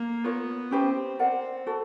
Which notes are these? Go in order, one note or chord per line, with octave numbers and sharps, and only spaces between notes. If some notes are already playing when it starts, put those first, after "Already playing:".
Already playing: A#3
B3 F4 A#4 C#5
C4 C#4 E4 G4 B4
C4 A#4 D5 F#5
F#4 A4